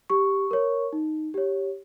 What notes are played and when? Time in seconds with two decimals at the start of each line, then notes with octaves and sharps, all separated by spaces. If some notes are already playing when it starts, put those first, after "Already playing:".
0.10 G4 C#6
0.51 A#4 C#5
0.93 D#4
1.34 G4 C#5